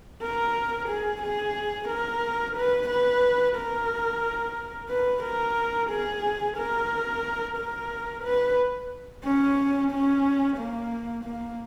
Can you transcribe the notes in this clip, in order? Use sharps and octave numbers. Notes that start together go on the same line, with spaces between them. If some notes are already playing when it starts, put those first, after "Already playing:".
A#4
G#4
G#4
A#4
B4
B4
A#4
B4
A#4
G#4
A#4
A#4
B4
C#4
C#4
A#3
A#3